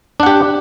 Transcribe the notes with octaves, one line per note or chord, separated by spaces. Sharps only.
D4 G4 F#5